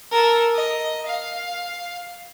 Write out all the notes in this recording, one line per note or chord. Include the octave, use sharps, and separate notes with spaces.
A4 A#4
D#5
F5